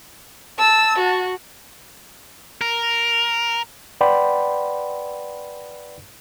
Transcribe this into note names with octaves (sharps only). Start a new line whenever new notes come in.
A5 E6
F#4
A#4
B4 D5 F#5 G5 B5 C6